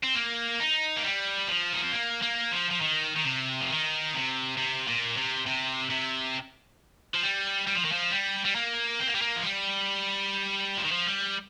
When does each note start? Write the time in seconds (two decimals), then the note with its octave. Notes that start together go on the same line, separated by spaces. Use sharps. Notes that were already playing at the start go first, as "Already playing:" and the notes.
0.03 C4
0.15 A#3
0.60 D#4
0.97 A#3
1.04 G3
1.48 F3
1.73 D#4
1.84 C4
1.92 A#3
2.22 A#3
2.51 F3
2.70 F3
2.81 D#3
3.16 D#3
3.25 C3
3.61 F3
3.70 D#3
4.14 C3
4.57 C3
4.88 A#2
5.17 C3
5.46 C3
5.90 C3
7.14 F3
7.23 G3
7.67 G3
7.75 F3
7.85 D#3
7.92 F3
8.11 G3
8.45 G3
8.55 A#3
9.00 C4
9.07 A#3
9.15 G3
9.22 A#3
9.36 F3
9.44 G3
10.77 F3
10.84 D#3
10.92 F3
11.07 G3